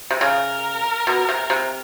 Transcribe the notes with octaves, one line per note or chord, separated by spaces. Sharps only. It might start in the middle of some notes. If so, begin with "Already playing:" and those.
C3
C#3 A#4
B2
C3
C3